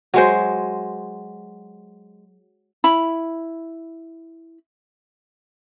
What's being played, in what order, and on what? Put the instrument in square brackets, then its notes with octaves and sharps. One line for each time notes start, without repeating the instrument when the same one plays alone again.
[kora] F#3 G#3 C5
[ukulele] E4 B5